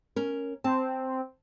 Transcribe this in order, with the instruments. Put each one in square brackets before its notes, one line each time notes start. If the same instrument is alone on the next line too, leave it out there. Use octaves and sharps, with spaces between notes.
[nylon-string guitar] C#4 A#4
[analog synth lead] C4 [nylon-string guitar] A5